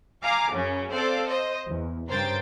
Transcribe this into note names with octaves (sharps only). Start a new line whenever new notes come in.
F5 G#5 A#5 D6
F#2 C#3 C#4
C4 A4 C5 D5 F5
C5 D#5
E2
G2 C#3 A#4 C5 G5 A6